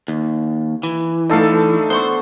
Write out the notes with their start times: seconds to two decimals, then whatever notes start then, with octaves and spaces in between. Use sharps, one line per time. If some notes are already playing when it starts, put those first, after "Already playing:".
0.08 D#2
0.83 E3
1.30 D3 A3 D#4 A4 F5
1.90 B3 C5 C6 C#6